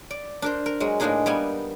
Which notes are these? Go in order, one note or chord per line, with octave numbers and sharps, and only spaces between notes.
D5
D4 A#4 C5
A#4
F#3 G#3
A2 G#3 A#3 D4 D#4 G#4
G3 A#3 B3 G#5